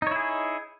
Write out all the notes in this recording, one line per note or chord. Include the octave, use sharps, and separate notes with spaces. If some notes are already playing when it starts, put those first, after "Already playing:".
D#4 E4 G#4 C#5